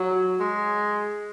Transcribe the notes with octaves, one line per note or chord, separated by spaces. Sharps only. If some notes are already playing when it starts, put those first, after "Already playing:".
Already playing: F#3
G#3